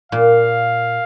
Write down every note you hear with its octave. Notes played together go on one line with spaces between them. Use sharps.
A#2 F5